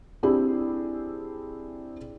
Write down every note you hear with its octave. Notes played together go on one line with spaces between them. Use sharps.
C4 D4 E4 G4 G#4